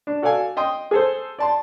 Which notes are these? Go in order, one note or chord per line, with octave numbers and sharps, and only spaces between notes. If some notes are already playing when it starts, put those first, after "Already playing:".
D4
F#4 A4 D5 F5 G#5
D#5 G5 C6 D#6
G#4 A4 C5
D5 A5 C6